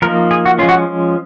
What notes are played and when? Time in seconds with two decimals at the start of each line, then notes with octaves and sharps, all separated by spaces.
0.02 F3 A#3 D#4 A#4
0.31 G#4
0.45 F#4
0.59 F3 G#3 C#4 F4
0.69 F#4